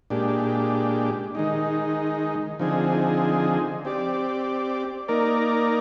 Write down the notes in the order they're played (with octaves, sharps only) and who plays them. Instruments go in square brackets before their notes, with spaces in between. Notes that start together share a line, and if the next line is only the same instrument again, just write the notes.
[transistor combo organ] A#2 G#3 D4 G4
D#3 G#3 D#4
D3 F3 C4 D#4 G#4
C4 G4 D5
A#3 D#4 A#4 D5